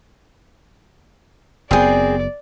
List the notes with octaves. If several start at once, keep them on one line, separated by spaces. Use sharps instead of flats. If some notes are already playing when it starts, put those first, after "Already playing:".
F#1 B3 C4 G#4 D5